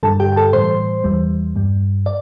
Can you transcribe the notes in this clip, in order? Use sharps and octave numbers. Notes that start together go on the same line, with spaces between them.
G2 D3 G3 A4 A5
G4 G5
G5
A4 A5
A2 E3 G3 C5 C6
E2 E3 G3
G2 G3
D5